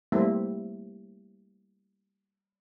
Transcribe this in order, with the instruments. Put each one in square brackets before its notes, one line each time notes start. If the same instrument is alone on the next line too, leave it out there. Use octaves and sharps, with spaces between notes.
[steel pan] G3 A3 A#3 C4 E4